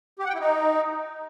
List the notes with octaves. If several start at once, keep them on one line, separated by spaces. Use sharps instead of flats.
G4
F#5
G5
E4
D#4